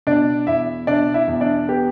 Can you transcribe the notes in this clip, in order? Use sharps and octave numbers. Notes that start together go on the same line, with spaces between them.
B2 D4 D5
E2 E4 E5
B2 D4 D5
E4 E5
E2
D4 D5
B3 G4